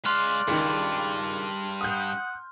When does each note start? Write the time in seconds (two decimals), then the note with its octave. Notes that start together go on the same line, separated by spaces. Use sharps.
0.05 G#3 D5 F5 C6 F6 F#6
0.48 C#2 G2 D#3
1.81 F#5 D#6 G6